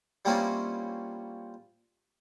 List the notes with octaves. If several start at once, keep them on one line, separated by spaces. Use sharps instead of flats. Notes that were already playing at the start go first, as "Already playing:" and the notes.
G3 A#3 C4 C#4 E4 F4